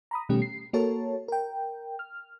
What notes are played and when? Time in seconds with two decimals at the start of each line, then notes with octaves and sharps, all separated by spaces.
0.11 A#5 B5 D#6
0.29 B2 D#3 G3 A3 C#4 G4
0.42 C7
0.73 A#3 F#4 A4 A#4 C#5 A5
1.28 A#4 G5
1.99 F6